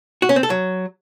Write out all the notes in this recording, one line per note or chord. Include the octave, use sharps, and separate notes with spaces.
F#4
C#4
C4
A4
F#3